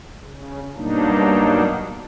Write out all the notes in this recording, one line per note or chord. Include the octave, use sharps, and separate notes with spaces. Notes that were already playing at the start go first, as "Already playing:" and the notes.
C#3
G2 B2 F#3 A#3 D4 D#4